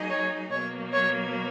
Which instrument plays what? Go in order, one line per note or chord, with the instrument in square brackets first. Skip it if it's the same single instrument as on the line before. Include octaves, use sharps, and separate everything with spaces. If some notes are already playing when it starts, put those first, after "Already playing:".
Already playing: [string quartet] F#3 A#3 D#4 G#4 D#5
[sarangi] C#5
[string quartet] B2 F#3 A#3 [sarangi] C#5
[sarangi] C#5